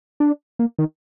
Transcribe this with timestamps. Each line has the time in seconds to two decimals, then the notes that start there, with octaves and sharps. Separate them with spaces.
0.20 D4
0.59 A#3
0.79 D#3